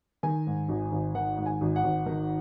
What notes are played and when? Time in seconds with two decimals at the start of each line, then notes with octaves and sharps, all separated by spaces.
0.23 D#3 G#5
0.47 G#2
0.69 G#1
0.92 G#1
1.15 D#3 F#5
1.37 G#2
1.46 G#5
1.61 G#1
1.76 F#5
1.84 G#1
2.06 D#3